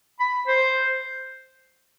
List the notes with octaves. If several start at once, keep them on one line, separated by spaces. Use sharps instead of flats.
B5
C5